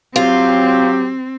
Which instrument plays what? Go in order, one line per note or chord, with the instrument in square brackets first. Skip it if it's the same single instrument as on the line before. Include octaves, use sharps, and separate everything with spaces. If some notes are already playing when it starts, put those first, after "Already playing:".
[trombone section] F#3 G4 [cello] C4 [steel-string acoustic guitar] F4